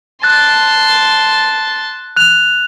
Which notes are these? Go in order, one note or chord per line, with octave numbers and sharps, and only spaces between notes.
A5 C6 F#6 A6
F#6 F7